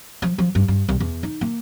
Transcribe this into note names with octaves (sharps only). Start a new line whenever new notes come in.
F3
F3
G2
G2
C2
E2
D#4
A#3